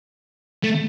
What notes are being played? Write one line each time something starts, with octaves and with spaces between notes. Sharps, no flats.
A3